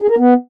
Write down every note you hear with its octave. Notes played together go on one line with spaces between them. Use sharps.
G#4
A#4
B3